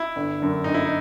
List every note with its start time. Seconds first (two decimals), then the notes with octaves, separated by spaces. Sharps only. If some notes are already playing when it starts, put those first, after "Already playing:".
Already playing: E4
0.16 G1
0.40 F#2 D3
0.64 G1 D#4
0.74 E4
0.85 D#4